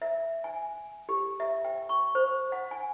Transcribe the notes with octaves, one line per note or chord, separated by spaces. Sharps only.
E5
G#5
G4
E5
G5
C#6
C5
F#5
G#5